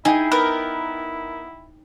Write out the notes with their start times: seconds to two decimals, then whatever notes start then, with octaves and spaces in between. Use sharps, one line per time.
0.05 D#4 E4 G#4 G5
0.32 B3 A#4